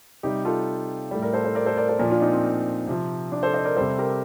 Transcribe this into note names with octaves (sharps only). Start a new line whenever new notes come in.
C3 G3 D#4 G4
F4 A4
A2 G3
A#4 D5
A4 C5
A4 C5
A#4 D5
A4 C5
A#4 D5
A4 C5
A#2 F3 A#4 D5
D4 F4
C4 D#4
C4
C3 F3
D4
A4 C5
C5 D#5
A#4 D5
C3 G3 A4 C5
G4 A#4